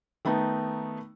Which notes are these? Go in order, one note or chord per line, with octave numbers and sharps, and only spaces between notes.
D#3 A3 B3 D#4